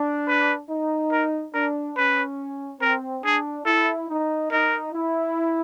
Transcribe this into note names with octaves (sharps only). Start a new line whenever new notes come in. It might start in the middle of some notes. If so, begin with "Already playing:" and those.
Already playing: D4
B4
D#4
A#4
D4 A#4
C#4 B4
C4 A#4
D4 G#4
E4 A4
D#4
D#4 A#4
E4